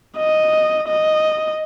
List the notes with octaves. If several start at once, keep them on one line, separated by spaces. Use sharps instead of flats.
D#5
D#5